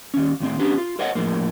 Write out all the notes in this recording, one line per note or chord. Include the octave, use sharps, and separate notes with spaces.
D#2 C#4
D#2 A2 C4
B3 C#4 D4 G4
F4
A#4 C5 C#5 D#5 F#5
F2 A2 F3 A#3